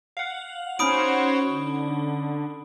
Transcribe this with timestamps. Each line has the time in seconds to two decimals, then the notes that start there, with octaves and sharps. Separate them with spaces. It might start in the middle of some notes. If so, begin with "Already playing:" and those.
0.17 F5 F#5
0.79 C#4 D#4 F#4 C5 C#5 B5 D#6 D7
1.48 D3